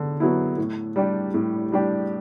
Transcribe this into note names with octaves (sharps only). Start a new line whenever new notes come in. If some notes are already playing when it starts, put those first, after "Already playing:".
Already playing: D3 B3
F#3 B3 E4
A2
G3 D4 G4
A2
G3 D4 G4